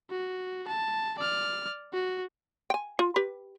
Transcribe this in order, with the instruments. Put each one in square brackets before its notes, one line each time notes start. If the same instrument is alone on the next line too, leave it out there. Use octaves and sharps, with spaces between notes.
[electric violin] F#4
A5
D5 F6
F#4
[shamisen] G5 G#5
F4
G4 B4